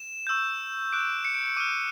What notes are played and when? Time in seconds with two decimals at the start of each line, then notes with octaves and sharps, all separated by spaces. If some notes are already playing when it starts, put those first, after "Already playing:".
Already playing: E7
0.27 C#6 E6 G6
0.93 D6 F#6 D7
1.25 C#7
1.35 D7
1.46 C#7
1.57 D6 F6 D#7